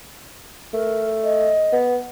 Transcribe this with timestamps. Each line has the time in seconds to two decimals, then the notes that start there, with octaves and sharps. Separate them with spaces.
0.74 A3 A#4
1.23 D#5
1.72 B3